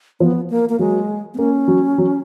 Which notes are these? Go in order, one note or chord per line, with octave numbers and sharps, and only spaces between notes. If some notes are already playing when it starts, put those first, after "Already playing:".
F3 B3
A#3
A#3
F#3 G#3
B3
A#3 C#4
F#3
F#3